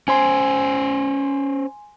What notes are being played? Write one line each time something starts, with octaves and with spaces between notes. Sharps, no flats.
C#4 C5 G#5 C6